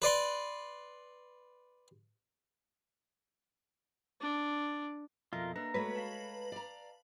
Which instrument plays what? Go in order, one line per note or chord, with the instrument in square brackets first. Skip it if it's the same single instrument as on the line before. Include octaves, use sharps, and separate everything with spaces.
[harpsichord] B4 D5 C6
[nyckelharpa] D4
[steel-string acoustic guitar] F2 B2 [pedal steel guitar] F4 A#4 [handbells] D#5 E5
[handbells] A#3 B4 [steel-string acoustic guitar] D4 [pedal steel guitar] A#5
[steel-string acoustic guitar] G#3 A3 C#5 [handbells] F#4 [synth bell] B4
[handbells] F5 A5
[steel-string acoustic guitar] D5 A#5